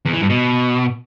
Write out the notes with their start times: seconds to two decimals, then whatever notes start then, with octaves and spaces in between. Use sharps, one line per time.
0.05 E2
0.13 E3
0.22 G2
0.30 B2